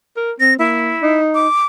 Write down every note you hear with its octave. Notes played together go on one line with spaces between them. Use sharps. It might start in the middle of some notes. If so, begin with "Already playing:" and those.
A#4
C4 A#6
A#3 E4
D#4
D6